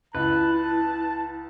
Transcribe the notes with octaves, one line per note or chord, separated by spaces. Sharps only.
C#2 E4 B4 A5